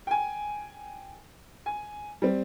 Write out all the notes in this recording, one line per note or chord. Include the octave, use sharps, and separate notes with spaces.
G5 G#5
G#5
G3 C4